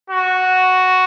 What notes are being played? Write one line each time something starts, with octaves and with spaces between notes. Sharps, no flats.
F#4